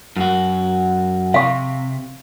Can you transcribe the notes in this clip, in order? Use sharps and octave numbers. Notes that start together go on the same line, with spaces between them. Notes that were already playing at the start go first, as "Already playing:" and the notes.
F#2 F#4
C3 F5 C#6